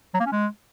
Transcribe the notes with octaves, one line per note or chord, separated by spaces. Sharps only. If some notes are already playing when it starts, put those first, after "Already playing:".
F#3
A#3
C#4
G#3